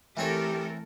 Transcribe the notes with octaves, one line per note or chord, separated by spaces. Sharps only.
E3 A3 C4 G4 A4 A#4 C#5